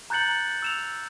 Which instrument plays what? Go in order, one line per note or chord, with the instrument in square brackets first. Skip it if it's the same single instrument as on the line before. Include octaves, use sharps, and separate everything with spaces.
[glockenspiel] A#5 F#6 G6 A6 C#7 F#7
E6 E7 F7